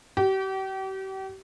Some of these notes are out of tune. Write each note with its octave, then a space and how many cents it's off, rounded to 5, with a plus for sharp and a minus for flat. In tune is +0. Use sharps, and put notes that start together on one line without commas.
G4 -40